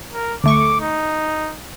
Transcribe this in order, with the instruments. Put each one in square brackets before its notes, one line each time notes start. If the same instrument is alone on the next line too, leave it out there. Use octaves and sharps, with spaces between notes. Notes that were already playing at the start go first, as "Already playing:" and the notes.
[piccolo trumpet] A#4
[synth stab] D2 A3 C#6 [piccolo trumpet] D6
[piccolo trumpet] D#4